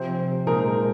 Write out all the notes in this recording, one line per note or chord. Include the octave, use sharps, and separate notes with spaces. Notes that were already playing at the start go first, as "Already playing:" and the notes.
Already playing: C3 F3 C4 C5
A#2 G#3 D#4 G#4 A#4
A#4